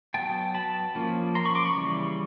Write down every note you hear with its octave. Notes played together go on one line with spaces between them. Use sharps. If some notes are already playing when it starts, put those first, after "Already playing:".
F#3 B3 G5 A5
A5 B5
F3 A#3 C#4
A#5 C6
B5 C#6
C6 D6
B5 C#6
C#3 E3 G3